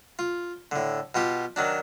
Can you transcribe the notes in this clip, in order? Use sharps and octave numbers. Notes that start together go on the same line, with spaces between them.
F4
A2 D3
B2 F4 G4
D#3 F#3 D4